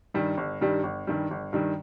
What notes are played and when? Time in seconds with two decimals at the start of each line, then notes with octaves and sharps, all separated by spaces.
0.14 G2 D#3 G3
0.37 G1
0.61 G2 D#3 G3
0.83 G1
1.07 G2 D#3 G3
1.31 G1
1.53 G2 D#3 G3